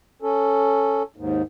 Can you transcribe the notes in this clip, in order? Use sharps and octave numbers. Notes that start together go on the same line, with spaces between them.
C#4 A4
D#2 G#2